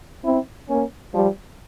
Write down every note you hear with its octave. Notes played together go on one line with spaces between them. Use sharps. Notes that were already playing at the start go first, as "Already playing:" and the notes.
C4 E4
A#3 C#4
F3 G3